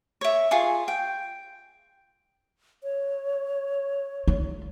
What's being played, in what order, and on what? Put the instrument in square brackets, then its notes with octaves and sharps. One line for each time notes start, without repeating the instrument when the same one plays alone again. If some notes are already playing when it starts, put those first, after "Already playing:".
[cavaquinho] C#5 E5
F4 G#4 G#5 C#6
G5
[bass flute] C#5
[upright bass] F4